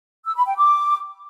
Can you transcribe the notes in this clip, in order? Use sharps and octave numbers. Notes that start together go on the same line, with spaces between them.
E6
B5
G5
D6